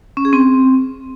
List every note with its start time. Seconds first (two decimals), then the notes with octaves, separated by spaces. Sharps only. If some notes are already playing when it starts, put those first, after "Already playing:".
0.17 C#4
0.25 G#4
0.33 C4